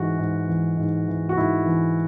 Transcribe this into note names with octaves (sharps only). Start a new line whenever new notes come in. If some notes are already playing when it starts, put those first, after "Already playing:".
Already playing: G#2 E3 F#4
G#2
E3
G#2
E3
F#4
G#2 E4
E3